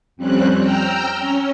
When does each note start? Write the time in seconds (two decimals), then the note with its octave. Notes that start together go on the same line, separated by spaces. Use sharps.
0.17 F2 G3 C4 C#4 F#6
0.59 G5 A#5 E6 F6 G6
1.18 C#4